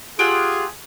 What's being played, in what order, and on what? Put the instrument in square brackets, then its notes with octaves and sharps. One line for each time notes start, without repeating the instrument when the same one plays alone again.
[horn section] F4 G#4 [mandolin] G4 F#5 E6